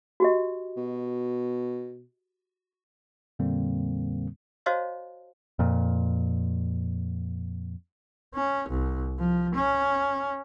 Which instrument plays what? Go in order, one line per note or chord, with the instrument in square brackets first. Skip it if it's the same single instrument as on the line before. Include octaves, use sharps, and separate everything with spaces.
[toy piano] F#4 G4 D#5
[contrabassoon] B2
[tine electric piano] F2 A#2 D3 G3 A#3 C4
[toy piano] F#4 C5 C#5 D#5 F5 A5
[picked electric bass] F2 A#2
[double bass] C#4
C2
F3
C#4